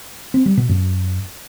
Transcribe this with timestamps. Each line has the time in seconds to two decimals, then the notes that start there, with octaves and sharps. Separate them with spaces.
0.34 C4
0.46 G3
0.57 B2
0.69 F#2